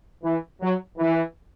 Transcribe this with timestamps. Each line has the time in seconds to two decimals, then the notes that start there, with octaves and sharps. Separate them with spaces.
0.23 E3
0.61 F#3
0.98 E3